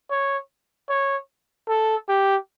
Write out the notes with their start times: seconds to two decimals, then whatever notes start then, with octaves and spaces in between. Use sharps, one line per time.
0.10 C#5
0.89 C#5
1.68 A4
2.08 G4